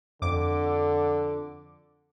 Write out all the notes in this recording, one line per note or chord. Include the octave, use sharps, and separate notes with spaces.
F2 D3 D6